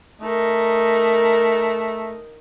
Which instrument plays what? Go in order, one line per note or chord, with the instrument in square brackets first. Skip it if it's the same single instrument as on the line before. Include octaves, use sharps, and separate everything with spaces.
[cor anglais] A3 [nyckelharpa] D#4 A#4